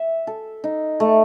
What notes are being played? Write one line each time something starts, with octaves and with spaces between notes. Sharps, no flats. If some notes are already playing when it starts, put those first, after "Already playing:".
Already playing: E5
A4
D#4
A3